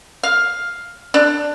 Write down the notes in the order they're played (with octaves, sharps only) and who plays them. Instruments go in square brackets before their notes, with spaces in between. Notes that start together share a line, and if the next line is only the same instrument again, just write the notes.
[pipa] F5
D4